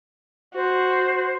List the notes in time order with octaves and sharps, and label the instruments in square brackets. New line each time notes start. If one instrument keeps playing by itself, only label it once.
[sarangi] F#4 [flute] C5